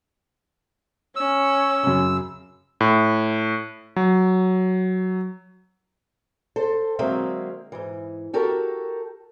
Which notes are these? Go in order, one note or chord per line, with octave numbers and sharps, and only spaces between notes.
C#4 E6
F#2 C#3
A2
F#3
A4 C5
D3 F#3 G#3 A#3 C4 E5
G#2 E3
F#4 G4 A4 A#4